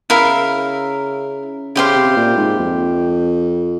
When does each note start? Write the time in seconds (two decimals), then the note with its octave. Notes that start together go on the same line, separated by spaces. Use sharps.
0.10 C#3 E4 A#4 F5
1.76 C#3 E4 G4 C5 F5
1.96 C3
2.10 C3
2.16 A#2
2.37 G#2
2.59 F2